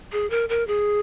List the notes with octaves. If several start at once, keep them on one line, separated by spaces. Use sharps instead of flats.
G#4
A#4
A#4
G#4